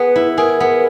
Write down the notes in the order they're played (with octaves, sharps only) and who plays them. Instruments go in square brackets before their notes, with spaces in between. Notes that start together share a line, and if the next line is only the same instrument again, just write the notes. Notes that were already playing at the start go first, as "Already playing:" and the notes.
Already playing: [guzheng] B3 G#4 [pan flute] B4
[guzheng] E4
[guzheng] G#4 [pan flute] A#4
[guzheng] B3